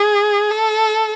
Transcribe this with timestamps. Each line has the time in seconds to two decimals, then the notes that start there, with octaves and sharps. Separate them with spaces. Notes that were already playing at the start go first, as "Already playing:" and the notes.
Already playing: G#4
0.51 A4